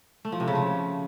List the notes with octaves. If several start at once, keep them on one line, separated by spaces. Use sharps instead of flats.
A3
F3
C3
C#3
F3